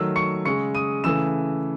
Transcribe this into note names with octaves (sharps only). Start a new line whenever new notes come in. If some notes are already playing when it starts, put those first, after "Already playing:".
Already playing: D#3 F#3 A3 E6
C#6 C#7
C#3 G#3 C#6 C#7
D#6 D#7
C#3 E3 A3 E6 E7